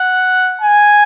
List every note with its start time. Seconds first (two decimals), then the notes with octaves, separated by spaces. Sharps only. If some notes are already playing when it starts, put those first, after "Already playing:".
Already playing: F#5
0.61 G#5